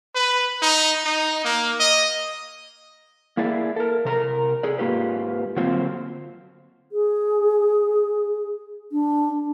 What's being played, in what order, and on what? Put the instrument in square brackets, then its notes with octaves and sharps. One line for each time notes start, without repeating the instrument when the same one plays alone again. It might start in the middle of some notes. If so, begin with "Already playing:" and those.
[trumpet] B4
D#4
D#4
A#3
D#5
[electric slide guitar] A#3 E4 G#4 D5 E5
A4 A#4
C3 A#4 B4 A#5
G#4 A4 D5
G#2 A#3 F4 G4 B4
D3 F#3 A#3 C4 F4 C5
[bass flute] G#4
D4